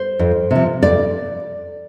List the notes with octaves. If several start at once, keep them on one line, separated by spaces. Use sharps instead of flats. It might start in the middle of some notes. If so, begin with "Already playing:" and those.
Already playing: C5
F2
C3 F3
F2 D5